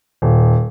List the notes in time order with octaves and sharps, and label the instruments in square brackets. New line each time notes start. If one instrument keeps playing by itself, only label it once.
[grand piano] D#1